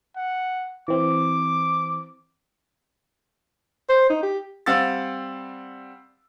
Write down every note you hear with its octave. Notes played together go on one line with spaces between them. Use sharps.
F#5
E3 C4 D6
C5
D#4
G4
G3 C4 F5 F#5 E6 A6